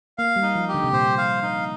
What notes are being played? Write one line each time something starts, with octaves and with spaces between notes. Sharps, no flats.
A#3 F5
G3
D#4
F3
G4
D3
C3
A#2 C5
F5
D#4